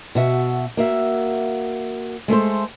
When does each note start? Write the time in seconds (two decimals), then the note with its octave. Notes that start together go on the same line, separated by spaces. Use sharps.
0.15 B2 F#4 E5
0.77 A#3 F#4 E5
2.28 G#3 A3 A4 C5